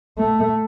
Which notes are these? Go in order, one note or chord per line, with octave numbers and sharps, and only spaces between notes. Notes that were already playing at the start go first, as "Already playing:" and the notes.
A3